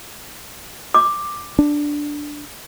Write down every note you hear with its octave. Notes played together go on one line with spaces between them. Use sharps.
D6
D4